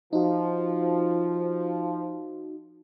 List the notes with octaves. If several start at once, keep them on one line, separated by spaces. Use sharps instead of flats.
F3 D#4 F#4